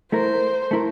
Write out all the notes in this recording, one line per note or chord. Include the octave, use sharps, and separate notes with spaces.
A3 E4 A#4 C5
A3 E4 A#4